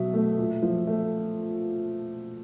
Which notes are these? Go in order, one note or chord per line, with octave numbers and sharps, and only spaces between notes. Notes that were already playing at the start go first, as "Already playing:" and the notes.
Already playing: B2 F#3 E5
A3
A#2
F3
A3